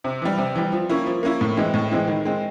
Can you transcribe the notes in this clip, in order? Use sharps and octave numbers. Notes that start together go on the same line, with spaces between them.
C3
E3 G3
C3
E3 G3
F3
A#3 C#4 E4
F3
A#3 C#4 E4
A2
E3 G#3 C4 E4
A2
E3 G#3 C4 E4
D#3
G#3 C4